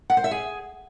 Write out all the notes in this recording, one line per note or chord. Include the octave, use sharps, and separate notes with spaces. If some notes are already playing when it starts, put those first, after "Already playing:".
F#5
C5
E5
G#4